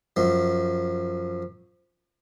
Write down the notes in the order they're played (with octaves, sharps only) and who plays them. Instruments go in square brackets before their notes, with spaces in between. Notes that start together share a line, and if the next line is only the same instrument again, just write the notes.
[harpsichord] F#2 F3